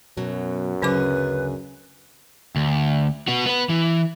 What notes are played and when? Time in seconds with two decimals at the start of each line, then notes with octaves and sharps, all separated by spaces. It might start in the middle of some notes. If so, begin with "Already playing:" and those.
0.17 F#2 B2 F#3
0.82 D2 C#3 F#3 C#4 G#4 B4 D6
2.56 D2
3.28 B3 F#4
3.46 B3 B4
3.69 E3